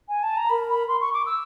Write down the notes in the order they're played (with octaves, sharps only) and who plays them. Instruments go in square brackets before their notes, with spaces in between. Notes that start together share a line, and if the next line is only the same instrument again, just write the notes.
[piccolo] G#5
A5
A#5
[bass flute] A#4 [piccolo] B5
[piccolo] B5
C6
C#6
D6
E6